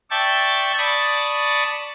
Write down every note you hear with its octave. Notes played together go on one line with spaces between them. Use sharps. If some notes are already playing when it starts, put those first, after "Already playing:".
D5 E5 G5 A5 C#6
D5 A5 B5 C#6 D#6